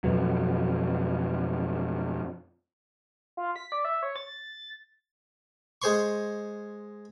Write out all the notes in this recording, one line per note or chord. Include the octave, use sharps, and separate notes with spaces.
F2 B2 F#3
F4
B6
D5
E5
C#5
A6
G#3 G#4 C5 C6 C#6